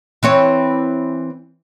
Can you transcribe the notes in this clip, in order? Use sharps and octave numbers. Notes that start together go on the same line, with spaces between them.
E3 C4 C#5